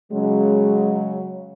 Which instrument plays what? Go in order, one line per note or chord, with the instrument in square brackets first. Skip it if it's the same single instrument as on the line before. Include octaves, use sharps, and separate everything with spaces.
[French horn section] C#3 F#3 [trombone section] G#3